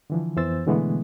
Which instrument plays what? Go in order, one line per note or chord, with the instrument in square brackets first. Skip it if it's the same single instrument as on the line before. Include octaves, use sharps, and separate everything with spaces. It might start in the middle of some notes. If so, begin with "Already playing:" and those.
[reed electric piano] D3 E3 F3
F2 E3 B3 C5 E6 A6
B2 D3 E3 G#3 A3 B3